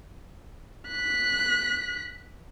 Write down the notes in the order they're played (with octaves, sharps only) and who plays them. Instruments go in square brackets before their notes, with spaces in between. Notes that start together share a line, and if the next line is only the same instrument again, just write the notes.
[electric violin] F#6 B6